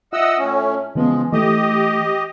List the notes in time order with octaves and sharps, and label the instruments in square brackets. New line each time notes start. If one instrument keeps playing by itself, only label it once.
[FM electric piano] F4 E5 [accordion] D#5 F#5 E6
[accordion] A2 C#4
[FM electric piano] C#3 E3 B3 [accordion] F3 G#3
[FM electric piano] E3 A3 [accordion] G4 D#5